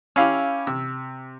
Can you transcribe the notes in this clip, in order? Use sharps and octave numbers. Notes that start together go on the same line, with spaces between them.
C#4 E4 G4 F5 B5 E6
C3 E6